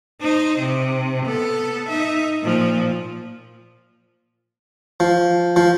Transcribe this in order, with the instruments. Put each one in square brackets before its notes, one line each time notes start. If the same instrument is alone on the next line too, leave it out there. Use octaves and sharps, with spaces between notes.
[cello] D#4 C5
C3
B3 A4
D#4 E5
A#2 F3
[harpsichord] F3
F3